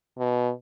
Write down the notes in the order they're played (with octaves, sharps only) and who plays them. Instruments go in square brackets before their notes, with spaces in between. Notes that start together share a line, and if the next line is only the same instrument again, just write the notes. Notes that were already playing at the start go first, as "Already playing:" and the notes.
[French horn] B2